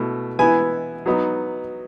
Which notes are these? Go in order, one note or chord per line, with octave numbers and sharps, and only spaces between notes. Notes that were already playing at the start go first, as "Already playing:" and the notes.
Already playing: B2 A3 E4
E3 B3 E4 G#5
F#3 B3 D#4